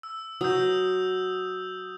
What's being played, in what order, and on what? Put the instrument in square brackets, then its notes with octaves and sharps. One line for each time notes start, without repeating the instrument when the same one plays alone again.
[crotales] E6
[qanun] F#3 [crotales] D#6 E6 G6